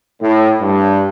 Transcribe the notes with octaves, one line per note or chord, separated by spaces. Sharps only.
A2
G2